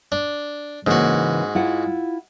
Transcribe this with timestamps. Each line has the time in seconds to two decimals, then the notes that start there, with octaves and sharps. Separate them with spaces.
0.12 D4
0.87 G#2 C#3 E3 A#3 F#4
1.55 E4 F4 F#5